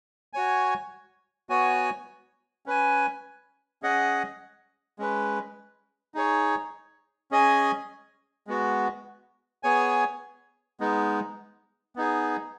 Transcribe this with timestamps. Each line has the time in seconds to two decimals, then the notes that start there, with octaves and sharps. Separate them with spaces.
0.33 F#4 C#5 G#5
1.49 B3 F#4 C#5 G#5
2.66 C#4 B4 G#5
3.82 C#4 G#4 D#5 F#5
4.99 G#3 C#4 B4
6.14 D#4 G#4 C#5
7.31 C#4 G#4 D#5 G#5
8.47 G#3 B3 F#4
9.63 B3 G#4 C#5 G#5
10.80 G#3 B3 D#4
11.96 B3 D#4 G#4